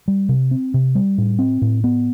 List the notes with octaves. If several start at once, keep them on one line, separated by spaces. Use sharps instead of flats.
G3
C3
C4
C3
G3
A2
C4
A2
B3